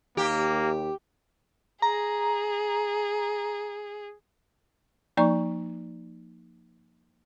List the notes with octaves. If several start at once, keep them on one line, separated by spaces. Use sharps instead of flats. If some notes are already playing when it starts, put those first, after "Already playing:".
D#2 A#3 G4
G#4 A#5
F3 A#3 D#4 D5 A#5 C#6